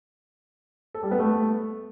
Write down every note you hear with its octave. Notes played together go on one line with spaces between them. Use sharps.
A4
G3
B3
A3